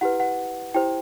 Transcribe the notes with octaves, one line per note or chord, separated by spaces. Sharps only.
E4 G4 B4 F#5
F#5
E4 G4 C5 G5